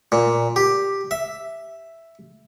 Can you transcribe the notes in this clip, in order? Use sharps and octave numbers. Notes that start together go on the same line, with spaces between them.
A#2
G4
E5